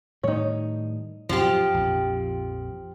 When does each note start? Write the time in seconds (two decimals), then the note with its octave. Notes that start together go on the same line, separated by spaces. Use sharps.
0.23 A2 D#3 G3 D#4 C#5
1.29 F#2 A#2 F3 G4
1.74 A#1 F2